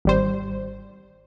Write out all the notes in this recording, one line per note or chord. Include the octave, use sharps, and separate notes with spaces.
G#1 G3 C5